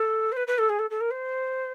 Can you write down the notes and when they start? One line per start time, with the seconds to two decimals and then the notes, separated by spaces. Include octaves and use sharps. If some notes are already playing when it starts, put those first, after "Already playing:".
Already playing: A4
0.32 C5
0.36 B4
0.47 B4
0.58 A4
0.69 G#4
0.79 A4
0.90 A4
1.00 A#4
1.11 C5